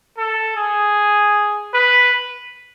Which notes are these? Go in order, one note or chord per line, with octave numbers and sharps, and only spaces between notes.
A4
G#4
B4